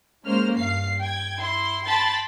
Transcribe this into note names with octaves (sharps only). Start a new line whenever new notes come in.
G#3 A#3 C#4 C5 F6
G2 F5 C7
G5 G#6
E4 C6
G5 A5 B5 C6 A6